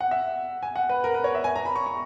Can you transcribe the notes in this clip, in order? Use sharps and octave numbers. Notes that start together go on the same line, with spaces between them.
F#5
E5
G#5
F#5
B4
A#4
B4
C#5
E5
G#5
A#5
B5
C#6
C#6